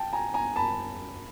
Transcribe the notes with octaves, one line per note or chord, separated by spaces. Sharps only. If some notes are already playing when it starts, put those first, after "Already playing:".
Already playing: G5 A5
G#5 A#5
G#5 A#5
A5 B5